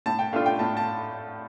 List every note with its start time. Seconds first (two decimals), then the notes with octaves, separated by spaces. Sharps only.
0.06 A2 A5
0.19 G5
0.33 A3 D4 F4 F5
0.46 G5
0.59 A2 A5
0.77 A5